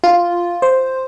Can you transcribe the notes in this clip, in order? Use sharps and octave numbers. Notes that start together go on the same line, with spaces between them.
F4
C5